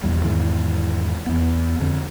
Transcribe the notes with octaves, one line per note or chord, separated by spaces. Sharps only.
E1 A#1 E2 G3
E2 G#2 D#3 E3
E2 B3
F2 D3